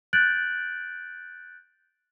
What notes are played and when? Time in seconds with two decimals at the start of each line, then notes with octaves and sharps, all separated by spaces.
0.13 F#6 G6 A6 D7 F#7